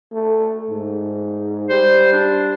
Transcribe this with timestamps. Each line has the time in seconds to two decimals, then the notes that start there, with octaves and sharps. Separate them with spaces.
0.12 A3
0.70 G#2
1.70 G3 C5
2.13 D4